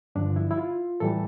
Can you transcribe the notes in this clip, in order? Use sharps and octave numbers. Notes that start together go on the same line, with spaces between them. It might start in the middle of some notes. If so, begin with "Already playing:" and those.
G2 D3 F3 D4
E4
E4
F4
A2 E3 G3 A4